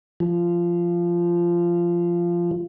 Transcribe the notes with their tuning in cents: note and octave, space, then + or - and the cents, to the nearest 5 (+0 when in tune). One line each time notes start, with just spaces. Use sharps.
F3 -15